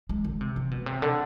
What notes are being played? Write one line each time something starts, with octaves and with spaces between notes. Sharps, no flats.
G#3
D3
C3
C3
B2
C3
D3